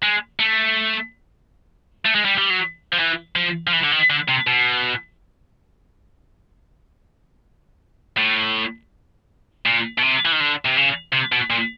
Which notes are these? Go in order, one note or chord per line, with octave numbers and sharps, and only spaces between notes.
G#3
A3
A3
G#3
G3
G3
F#3
F3
E3
F3
F3
E3
D3
D#3
D3
C3
B2
A2
A#2
B2
C3
E3
D#3
D3
C3
C#3
C3
B2
A#2